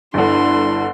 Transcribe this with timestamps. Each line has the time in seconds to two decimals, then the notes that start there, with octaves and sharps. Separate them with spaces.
0.14 G1 D3 D4 E4 C6